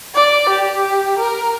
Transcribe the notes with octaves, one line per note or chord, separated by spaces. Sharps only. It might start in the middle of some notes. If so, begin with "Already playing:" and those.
D5
G4
A#4